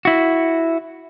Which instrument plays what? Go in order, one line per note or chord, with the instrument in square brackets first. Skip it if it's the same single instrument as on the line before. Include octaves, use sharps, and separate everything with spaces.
[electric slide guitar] E4 F#4